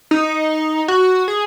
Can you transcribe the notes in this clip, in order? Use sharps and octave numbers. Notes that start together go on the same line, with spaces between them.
D#4
F#4
G#4